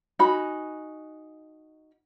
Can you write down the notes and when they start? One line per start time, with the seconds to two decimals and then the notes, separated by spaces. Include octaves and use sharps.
0.19 D#4 F#4 G#5 B5